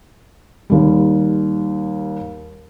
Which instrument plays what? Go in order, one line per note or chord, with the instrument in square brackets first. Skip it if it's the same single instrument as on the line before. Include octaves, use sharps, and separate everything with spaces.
[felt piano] D#2 G3